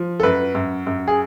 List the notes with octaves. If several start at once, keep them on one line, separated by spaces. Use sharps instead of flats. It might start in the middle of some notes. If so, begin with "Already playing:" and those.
Already playing: F3
A4
F#2 B4
F#2
F#2
G#4